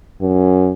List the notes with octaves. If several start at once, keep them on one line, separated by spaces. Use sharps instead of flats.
F#2